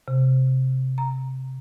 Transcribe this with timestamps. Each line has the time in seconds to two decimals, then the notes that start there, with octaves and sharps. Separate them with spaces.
0.08 C3
0.98 A#5